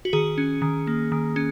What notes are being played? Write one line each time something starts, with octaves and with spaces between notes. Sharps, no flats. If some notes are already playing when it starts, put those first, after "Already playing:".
F#4
D#3 G#4
C#4
D#3
A#3
D#3
C#4